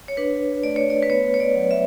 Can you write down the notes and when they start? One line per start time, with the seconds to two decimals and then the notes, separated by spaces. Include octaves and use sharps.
0.08 C#5
0.17 D4 B4
0.63 A3 D5
0.76 C#5
0.90 D5
1.03 B4
1.10 B3 C#5
1.34 C#5
1.40 D5
1.56 F#3
1.71 E5